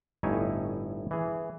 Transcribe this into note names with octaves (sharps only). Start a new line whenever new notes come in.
G1 A2 D#4 E4 C#5 G#5
E3 G#4